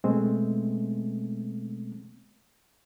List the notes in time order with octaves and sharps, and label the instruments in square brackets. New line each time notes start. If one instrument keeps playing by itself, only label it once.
[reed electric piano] B2 G#3 A3 B3 C4